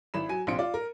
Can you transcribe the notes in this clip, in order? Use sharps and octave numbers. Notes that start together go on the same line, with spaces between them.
G#1 E4 B5 E7
F#3 G#5 D#7
A#1 C3 F4 C6 C#7 D7
F4 D5
A#4